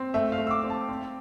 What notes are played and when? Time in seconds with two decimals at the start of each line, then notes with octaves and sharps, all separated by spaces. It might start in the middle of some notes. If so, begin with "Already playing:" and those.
Already playing: C4
0.14 A3 E5
0.32 F5
0.38 A3
0.47 E6
0.51 D6
0.64 C4
0.70 A5
0.88 C4